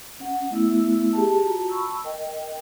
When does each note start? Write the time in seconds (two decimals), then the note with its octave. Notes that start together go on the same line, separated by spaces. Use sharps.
0.20 C#4 F#5
0.50 A3 B3 E4 E5 E6
1.13 G4 G#4 A5
1.42 F4 F#4 A5 A#5
1.69 A5 B5 C#6 E6
2.04 A#4 D#5 G5